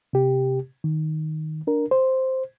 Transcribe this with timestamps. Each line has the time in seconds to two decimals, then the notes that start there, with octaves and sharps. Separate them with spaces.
0.13 C3 G4
0.84 D#3
1.67 D4 A#4
1.91 C5